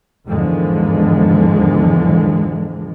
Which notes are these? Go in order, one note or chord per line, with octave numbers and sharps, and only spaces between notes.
E2 G#2 D3 D#3 F3 G#3